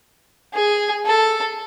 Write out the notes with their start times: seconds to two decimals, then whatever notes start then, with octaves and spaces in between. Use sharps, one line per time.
0.54 G#4
1.06 A4